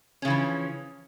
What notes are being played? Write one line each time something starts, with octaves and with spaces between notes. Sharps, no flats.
C#3 E3 F3 C#4